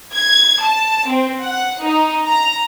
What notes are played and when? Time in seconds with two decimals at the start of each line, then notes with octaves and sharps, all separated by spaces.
0.13 G#6
0.63 A5
1.07 C4
1.41 F#5
1.84 D#4
2.26 A#5